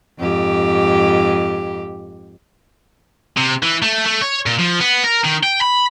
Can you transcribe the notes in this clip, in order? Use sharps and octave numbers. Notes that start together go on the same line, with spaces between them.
F2 G#2 G4
C3
E3
A3
A3
C#5
A#2
F3
B3
A#4
D#3
G5
B5